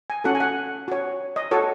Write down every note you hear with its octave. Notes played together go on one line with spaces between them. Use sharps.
G#5
C#4 F#4 A4 F#5
G#5
F#5
F#4 C#5
D#5
F#4 A4 C#5